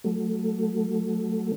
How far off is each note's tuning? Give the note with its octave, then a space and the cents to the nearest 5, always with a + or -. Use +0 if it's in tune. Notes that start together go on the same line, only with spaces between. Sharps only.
F#3 +0 A3 +5